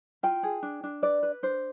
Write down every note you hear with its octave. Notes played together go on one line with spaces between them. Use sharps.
F4 G5
G#4
D4
D4
B4 D5
B4
D4 C5